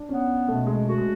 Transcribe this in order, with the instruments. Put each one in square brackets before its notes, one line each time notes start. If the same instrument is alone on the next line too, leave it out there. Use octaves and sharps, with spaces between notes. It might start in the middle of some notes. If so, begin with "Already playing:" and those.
Already playing: [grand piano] D4
[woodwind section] B3 [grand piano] C#4
[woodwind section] B2 [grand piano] A3
[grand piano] G#3
[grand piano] A3 [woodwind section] F#4
[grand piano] G#3